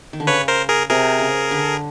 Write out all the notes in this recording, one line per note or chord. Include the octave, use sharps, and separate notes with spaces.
D#3
D3
C#3 B4 C#5
A#4 C5
G#4 A#4
C3 G#4 A#4
C#3
D3